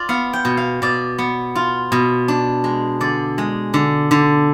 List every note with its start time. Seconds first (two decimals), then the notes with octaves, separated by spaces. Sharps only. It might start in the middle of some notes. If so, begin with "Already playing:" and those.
Already playing: F4 D5
0.09 B3 F5
0.33 G5
0.45 B2
0.57 F5
0.82 B2 D5
1.18 B3
1.55 F4
1.92 B2
2.28 D4
2.64 G#3
3.01 D3 D5
3.38 G#3
3.74 D3
4.11 D3